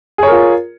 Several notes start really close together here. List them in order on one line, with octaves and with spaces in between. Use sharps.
G#4 C#5 A#4 F4